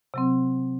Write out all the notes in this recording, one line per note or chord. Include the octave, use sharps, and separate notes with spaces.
C3 F#3 C4